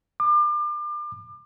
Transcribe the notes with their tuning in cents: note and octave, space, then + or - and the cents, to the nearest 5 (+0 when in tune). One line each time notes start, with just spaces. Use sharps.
D6 +35